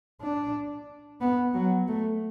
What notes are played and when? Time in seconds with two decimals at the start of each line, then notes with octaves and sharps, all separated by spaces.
0.21 D4
1.21 B3
1.54 F#3
1.88 A3